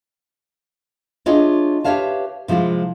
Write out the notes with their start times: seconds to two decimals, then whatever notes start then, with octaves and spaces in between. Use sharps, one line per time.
1.26 D4 E4 F4 G#4 C#5 D#5
1.84 G4 B4 C#5 E5 F5 A5
2.48 C3 F3 G#3 E4 F4